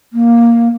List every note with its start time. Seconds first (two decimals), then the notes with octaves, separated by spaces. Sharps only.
0.13 A#3